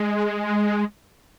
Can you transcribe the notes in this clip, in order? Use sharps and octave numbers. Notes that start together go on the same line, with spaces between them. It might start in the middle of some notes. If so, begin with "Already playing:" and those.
Already playing: G#3